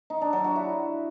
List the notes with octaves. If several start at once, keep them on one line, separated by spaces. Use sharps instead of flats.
D#4
D4
F#3
F#4
E4